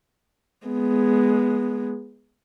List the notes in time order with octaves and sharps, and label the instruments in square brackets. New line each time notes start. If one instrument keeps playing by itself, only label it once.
[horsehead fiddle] G#3 B3